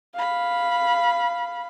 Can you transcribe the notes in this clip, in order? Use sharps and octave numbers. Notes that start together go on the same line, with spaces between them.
F5 B5